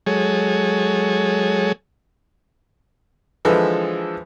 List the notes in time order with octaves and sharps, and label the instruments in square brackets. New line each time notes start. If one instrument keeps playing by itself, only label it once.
[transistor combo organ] F#3 G#3 G#4 A4 C#5
[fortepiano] D3 E3 F3 G#3 A4 B4